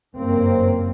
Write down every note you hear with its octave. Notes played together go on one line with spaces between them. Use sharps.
F#1 G2 A#3 C4